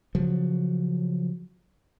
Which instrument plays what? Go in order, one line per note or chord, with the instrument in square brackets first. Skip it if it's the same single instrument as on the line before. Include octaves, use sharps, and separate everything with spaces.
[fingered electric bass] C#3 F3 F#3